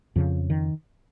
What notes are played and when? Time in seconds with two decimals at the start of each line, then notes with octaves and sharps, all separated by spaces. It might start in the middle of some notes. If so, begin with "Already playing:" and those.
0.16 F2 C#3 F3
0.50 D#3